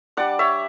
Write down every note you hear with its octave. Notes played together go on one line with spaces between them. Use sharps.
G3 D4 D5 F#5
C#5 E5